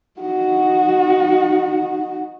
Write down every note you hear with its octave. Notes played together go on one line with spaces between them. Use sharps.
D#4 F#4